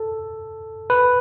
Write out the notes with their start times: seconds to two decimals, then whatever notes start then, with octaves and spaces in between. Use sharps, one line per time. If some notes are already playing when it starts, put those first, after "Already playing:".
Already playing: A4
0.90 B4